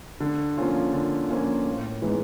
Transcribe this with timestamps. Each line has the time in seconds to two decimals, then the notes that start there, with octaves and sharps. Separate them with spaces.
0.20 D3
0.57 F3 A#3 C#4 F4
0.93 D3
1.29 F3 A#3 C#4 F4
1.66 A2
2.02 E3 G#3 B3 D#4